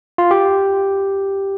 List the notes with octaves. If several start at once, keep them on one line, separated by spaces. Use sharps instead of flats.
F4
G4